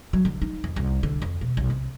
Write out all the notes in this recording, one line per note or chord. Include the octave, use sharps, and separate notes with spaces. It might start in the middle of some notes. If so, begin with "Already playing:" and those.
F#3
D3
D#4
F2
C2
D3
F2
B2
B1
C3